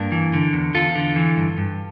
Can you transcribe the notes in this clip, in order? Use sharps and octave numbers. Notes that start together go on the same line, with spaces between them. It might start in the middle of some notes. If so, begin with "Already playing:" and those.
Already playing: G2 A#3 D4
E3
D3
E2
E2 F4 A4
D3
E3
G2
G2